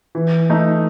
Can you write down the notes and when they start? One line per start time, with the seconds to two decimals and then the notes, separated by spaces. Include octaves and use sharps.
0.15 E3
0.50 A3 D#4